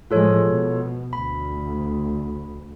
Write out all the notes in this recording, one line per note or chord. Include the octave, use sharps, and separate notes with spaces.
A2 F3 G#3 F4 A4 C#5
B2
D2 B5